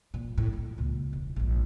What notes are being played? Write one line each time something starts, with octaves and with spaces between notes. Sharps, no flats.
A#2
A2
A#2
C#2 A#2
E1
A#1 G#2